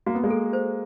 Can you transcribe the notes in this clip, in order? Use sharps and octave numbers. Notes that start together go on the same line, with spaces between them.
A#3 F#4
B3
G#3 A#3
A4
C5